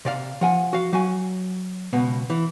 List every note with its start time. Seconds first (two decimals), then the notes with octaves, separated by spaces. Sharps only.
0.05 C3 D5 F5
0.41 F3 F#5 G#5
0.73 F#4 F5
0.93 F#3 F#4 G#5
1.93 C#2 B2 B3
2.30 E3